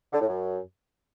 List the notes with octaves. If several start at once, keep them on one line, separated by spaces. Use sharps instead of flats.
D3
A2
F#2